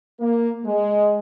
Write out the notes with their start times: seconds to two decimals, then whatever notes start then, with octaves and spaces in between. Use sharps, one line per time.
0.20 A#3
0.65 G#3